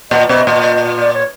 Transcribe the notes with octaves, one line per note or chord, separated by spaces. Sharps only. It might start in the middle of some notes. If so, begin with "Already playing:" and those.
A#2 D#5
B2 D#5
A#2
D5
C#5